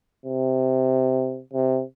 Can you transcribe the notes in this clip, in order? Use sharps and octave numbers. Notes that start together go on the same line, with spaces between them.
C3
C3